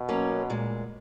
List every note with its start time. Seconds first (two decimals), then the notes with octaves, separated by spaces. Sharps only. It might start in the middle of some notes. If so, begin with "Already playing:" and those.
Already playing: B2
0.09 F#3 A#3 C#4
0.50 A#2 G#3